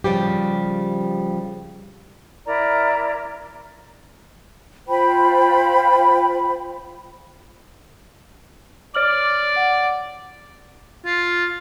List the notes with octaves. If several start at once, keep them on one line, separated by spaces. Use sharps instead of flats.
C#3 F3 G3 G4
E4 A#4 D5 A#5
F4 C5 G5 B5
C#5 D5 F6 F#7
F#5
F4